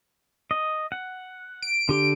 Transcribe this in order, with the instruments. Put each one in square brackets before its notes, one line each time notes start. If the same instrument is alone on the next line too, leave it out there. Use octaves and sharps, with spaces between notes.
[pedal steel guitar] D#5
F#5
[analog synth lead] D7
[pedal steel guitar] D3 G4